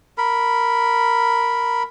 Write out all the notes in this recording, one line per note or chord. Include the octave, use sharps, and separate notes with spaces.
A#4 B5